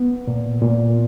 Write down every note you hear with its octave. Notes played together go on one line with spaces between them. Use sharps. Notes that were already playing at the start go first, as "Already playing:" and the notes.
Already playing: B3
A#2
A#2